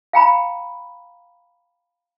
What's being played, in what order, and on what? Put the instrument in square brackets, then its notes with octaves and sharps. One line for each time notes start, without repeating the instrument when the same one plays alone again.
[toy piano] F5 G5 A#5 B5